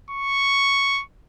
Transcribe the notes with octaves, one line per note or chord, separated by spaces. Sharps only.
C#6